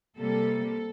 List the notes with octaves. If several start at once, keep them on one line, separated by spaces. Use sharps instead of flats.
C3 G3 A#3 A4